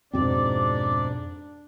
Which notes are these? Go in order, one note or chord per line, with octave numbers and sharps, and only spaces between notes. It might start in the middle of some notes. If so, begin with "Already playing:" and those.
F2 G#2 B2 C4 D4 D5